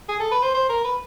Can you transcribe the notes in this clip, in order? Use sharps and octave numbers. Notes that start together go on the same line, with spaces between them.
G#4
A4
B4
C5
C5
A#4
B4